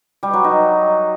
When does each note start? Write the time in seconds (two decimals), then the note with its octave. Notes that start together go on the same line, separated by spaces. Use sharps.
0.23 G3
0.33 F#3
0.44 D#4